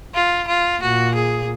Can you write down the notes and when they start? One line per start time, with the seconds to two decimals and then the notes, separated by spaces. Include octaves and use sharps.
0.14 F4
0.47 F4
0.82 A#2 F#4
1.15 G#4